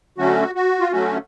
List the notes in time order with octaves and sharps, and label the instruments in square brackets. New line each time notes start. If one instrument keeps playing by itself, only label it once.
[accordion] D3 F#3 A3 C#4 F#4
F#4
F4
D3 F#3 A3 C#4 F#4